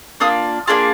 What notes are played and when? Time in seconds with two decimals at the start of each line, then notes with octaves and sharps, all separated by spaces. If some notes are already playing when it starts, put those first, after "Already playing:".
0.20 A#3 D4 F4 D#6
0.68 A#3 D4 F4 G#4